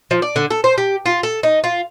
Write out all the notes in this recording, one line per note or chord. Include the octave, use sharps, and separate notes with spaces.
F3
D5
D3
A4
C5
G4
F4
A4
D#4
F4